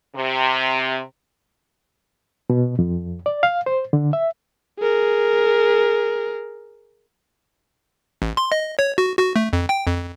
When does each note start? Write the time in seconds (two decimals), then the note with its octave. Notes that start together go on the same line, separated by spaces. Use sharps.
0.16 C3
2.50 B2
2.79 F2
3.26 D5
3.43 F5
3.66 C5
3.93 D3
4.13 E5
4.79 G#4 A#4
8.22 A1
8.37 C6
8.52 D#5
8.79 C#5
8.98 F#4
9.19 F#4
9.36 A3
9.53 F2
9.69 G5
9.87 F2